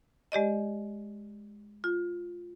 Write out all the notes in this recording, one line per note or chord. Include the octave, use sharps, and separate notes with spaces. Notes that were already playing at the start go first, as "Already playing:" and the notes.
G#3 G4 D5 D#5
F4